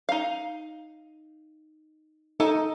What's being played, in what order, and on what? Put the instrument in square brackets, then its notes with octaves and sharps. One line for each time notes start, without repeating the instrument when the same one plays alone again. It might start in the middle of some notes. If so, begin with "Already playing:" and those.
[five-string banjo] D#4 F5
[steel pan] D#4 [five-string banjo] A4 G#5